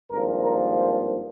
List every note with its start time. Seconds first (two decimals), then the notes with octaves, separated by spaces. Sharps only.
0.10 G#1 G2 F3 A#3 A#4
0.44 A#4
0.79 C5